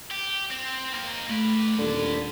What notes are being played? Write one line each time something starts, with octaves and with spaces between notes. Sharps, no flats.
G4
C4
A#3 D#4
A3 B4 D5
D#1 D3